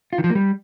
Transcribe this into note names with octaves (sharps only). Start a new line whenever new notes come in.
F4
D#3
F3
A#3
G3